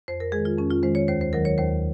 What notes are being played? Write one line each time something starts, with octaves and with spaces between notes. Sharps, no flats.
F2 C5
A#4
D#3 G#3 G#4
F4
F2 C#4
F4
D#3 G#3 C5
C#5
D#2 C5
C5
D#3 F#3 A#4
C#5
D#2 C5